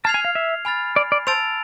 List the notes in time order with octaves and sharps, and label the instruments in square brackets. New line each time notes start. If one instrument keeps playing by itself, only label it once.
[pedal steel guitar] A5 [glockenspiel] F6 G#6 C7 F7
[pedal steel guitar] G#5
F5
E5
[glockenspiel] G#5 B5 F6 A6
[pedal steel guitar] D5
D5
[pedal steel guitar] C5 [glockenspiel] A5 E6 A6 D7 F7